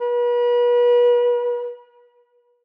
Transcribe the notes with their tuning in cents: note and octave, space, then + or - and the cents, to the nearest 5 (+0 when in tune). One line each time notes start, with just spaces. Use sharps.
B4 -35